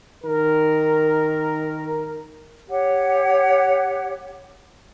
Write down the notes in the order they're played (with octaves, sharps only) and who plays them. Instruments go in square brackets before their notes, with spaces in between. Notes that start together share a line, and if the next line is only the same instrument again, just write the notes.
[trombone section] D#3 A#4
[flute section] G4 C#5 F#5